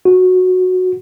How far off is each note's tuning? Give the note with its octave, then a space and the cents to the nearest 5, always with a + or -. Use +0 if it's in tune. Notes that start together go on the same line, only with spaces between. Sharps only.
F#4 -10